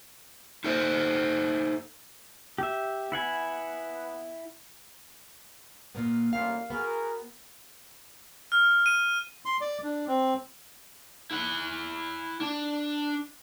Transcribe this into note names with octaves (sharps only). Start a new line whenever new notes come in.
D#4 A4 C5
G4 E5
B3 E4 F#5 G#5
A#2 A#3 B3
A1 G2 A#2 F5
B3 F#4 G#4 A#4
F6
D#7
C6
D5
D4
C4
E4 F#5
D4